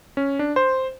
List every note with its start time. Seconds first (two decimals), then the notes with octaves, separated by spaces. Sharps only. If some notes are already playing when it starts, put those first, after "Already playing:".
0.17 C#4
0.39 D4
0.56 C5